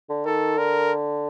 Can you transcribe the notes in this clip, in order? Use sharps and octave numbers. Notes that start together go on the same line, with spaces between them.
D3
D#3 A4
D3 A#4